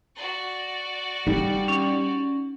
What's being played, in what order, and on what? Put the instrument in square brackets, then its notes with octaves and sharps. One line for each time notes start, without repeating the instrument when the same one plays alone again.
[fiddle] F#4 D5
[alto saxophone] G3 [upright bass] D#4
[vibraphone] C#4